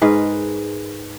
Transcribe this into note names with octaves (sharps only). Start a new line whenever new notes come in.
G#2 G#4 A#4 B4